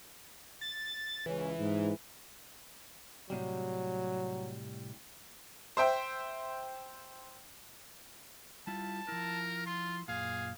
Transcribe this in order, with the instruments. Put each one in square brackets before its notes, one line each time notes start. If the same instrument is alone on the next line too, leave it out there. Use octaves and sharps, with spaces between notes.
[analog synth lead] A6
[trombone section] C#2 C#3 C#4 [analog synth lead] E3
[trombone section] G#2
[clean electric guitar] A2 C3 G3 [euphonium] F#3
[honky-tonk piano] C5 E5 G5
[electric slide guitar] G3 E4 F4 [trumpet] A5
[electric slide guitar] F3 E4 [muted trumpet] A#4
[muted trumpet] F4 [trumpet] C6
[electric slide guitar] F#2 A#2 [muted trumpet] G#4 [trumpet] F5